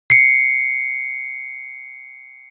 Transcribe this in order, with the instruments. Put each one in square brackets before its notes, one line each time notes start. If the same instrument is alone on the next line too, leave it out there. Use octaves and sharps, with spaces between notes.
[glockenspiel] C7 C#7